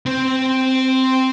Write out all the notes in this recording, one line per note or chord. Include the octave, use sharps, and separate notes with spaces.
C4